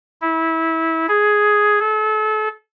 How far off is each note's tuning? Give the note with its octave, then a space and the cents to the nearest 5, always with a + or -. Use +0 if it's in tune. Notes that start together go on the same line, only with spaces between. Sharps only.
E4 -20
G#4 +5
A4 -35